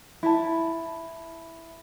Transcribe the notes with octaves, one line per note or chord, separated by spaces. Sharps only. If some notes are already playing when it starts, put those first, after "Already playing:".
E4 A5